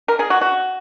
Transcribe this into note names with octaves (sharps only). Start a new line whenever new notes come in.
A#4
G#4
F#4
F#4